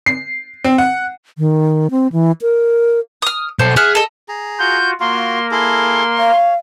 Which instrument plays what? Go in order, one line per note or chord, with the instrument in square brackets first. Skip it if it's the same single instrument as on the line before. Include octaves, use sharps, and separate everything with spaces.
[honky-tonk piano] C7
C4
F#5
[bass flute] D#3
C4
E3
A#4
[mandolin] D#6 F6
[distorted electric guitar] B1 A4 [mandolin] C5
[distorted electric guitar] G#4 [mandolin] E5 F#5 F6
[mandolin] A4 D#5
[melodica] G#4 A#5
[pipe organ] F4 F#4 [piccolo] G6
[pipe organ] A#3 A#4 [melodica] F4 F#4 [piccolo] C6
[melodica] E4 G#4 A4 [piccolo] C6
[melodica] C#5 [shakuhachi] F5